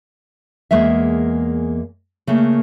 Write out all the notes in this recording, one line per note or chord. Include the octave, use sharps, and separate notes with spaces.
E2 G#3 A#3 E5
C#3 A3 A#3